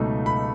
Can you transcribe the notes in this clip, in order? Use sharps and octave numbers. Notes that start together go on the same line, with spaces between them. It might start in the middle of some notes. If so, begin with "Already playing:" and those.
Already playing: C#2 B2 F#3 A3 D#4
B5